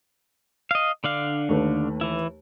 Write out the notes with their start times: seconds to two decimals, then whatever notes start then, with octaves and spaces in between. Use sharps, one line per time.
0.71 D#5 F5
1.04 D3 D4 F5
1.49 D#2 A3 B4
2.01 E3 E4